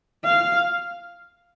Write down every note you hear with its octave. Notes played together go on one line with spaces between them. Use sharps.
F5